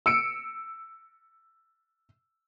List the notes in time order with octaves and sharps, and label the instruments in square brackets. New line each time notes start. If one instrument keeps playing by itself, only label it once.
[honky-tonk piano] E6 C#7 D7